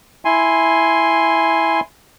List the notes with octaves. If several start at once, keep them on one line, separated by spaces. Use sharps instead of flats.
E4 G#5 C6